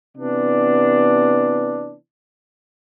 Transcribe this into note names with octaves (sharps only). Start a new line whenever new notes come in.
C3 E3 B3 D4